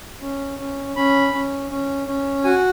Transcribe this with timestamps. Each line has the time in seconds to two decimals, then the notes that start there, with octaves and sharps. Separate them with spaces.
0.22 C#4
0.59 C#4
0.96 C#4 B5
1.33 C#4
1.70 C#4
2.07 C#4
2.44 F#4 G#5